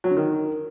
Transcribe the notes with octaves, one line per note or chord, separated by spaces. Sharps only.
F#3
D3
D#3